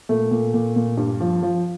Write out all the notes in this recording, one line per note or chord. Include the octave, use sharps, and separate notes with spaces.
A#2 A3
A#2
A#2
A#2
G2
F3
F3